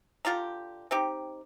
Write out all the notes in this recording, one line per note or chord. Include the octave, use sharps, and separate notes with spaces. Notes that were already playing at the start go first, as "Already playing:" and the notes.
D3 F4 G4 A#5
C4 D#4 G4